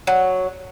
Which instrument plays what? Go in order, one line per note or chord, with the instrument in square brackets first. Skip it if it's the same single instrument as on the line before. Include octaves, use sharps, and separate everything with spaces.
[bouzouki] F#3